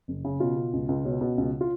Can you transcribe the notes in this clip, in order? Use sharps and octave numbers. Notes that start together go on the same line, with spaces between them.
F#1
C#3
B2 F4
B2
C#2
C#2
B2 C#4
B2
C#2
F4